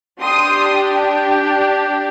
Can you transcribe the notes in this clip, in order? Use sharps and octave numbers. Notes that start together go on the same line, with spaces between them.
D4 G4 C6 D#6